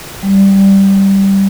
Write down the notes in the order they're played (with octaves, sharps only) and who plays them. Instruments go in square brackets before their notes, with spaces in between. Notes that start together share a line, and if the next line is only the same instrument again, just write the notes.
[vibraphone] G3